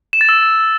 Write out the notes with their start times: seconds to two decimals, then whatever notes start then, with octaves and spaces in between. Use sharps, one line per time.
0.13 E7
0.21 A6
0.29 E6